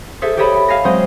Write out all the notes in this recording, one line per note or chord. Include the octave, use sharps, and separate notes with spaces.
G#4 A4 C5 E5
G4 A4 C#5 D#5 E5 B5
E5 F5 G#5 A#6
F#3 G#3 C4 C5 D#5